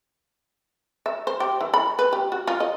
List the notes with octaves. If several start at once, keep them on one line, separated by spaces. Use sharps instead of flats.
E5
C5
G4
E3
B5
B4
G4
F#4
F4
D#5